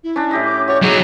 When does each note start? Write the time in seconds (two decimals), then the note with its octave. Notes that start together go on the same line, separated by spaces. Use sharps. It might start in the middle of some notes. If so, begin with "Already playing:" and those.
0.04 E4
0.16 C#4 D4
0.31 A2 G4 D#5
0.44 D6
0.67 F#4 C#5 D5
0.83 F#3 D#4 G#4